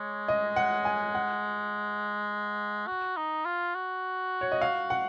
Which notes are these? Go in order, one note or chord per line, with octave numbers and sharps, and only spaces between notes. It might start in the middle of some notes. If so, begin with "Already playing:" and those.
Already playing: G#3 C#5
D#5
F#5
G#5
F#5
F#4
D#4
F4
F#4
C#5
D#5
F5
F#5